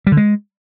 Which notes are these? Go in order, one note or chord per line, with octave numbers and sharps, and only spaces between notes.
G3
D3
G#3